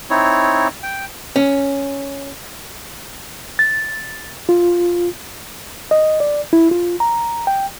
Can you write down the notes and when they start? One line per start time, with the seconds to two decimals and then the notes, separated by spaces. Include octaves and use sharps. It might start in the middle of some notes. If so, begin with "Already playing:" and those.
0.10 C4 D#4 E4 C#5
0.83 G5
1.36 C#4
3.59 A6
4.49 F4
5.91 D#5
6.20 D5
6.53 E4
6.71 F4
7.00 A#5
7.47 G5